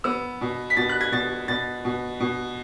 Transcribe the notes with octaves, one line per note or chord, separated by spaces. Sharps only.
B3 E6
B2
B6
B2 A6
F#6
G#6
B2 A6
B2 A6
B2
B2